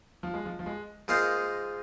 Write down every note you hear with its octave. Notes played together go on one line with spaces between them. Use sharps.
F3
G#3
F3
F3
G#3
G#2 G#3 A#3 F4 C5 D#5